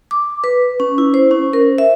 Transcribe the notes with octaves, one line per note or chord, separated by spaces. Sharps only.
D6
B4
C#4
E4
C5
C#4
A#4
E5